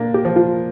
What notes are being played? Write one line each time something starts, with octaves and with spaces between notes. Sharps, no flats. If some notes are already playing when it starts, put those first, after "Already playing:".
Already playing: A#2 A#3 D4
G4
F3
F4